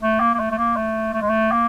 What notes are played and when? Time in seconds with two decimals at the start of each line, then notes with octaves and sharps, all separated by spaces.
0.02 A3
0.20 A#3
0.34 A#3
0.39 A3
0.51 A3
0.58 A#3
0.76 A3
1.14 A3
1.22 G#3
1.29 A3
1.51 A#3